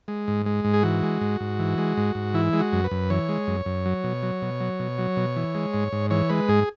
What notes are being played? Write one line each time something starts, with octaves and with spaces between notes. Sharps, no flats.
G#3
G#2
G#3
G#2
G#4
E3 F#4
G#3
G#2
G#2
E3
G#3
G#2
G#2
E3 E4
G#3
F#4
F#2
B4
F#2
E3 C#5
G#3
F#2
F#2
F#3
B2
F#3
B2
F#3
B2
F#3
B2
E3
G#3
G#2
G#2
E3 C#5
G#3 B4
G#2 G#4